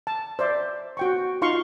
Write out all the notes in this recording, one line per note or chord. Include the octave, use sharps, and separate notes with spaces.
A5
C5 D5 E5
F#4 G5 C#6
D#4 F4 F5 C6 C#6